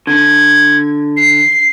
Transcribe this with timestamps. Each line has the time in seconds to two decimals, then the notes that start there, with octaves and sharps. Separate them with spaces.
0.07 D3 G#6
1.17 C7